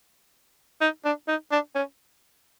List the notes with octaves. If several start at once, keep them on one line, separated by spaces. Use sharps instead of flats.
D#4
D4
D#4
D4
C#4